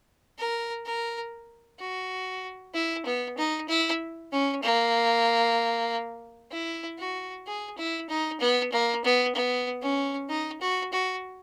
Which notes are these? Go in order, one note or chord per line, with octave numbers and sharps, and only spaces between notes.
A#4
A#4
F#4
E4
B3
D#4
E4
C#4
A#3
E4
F#4
G#4
E4
D#4
B3
A#3
B3
B3
C#4
D#4
F#4
F#4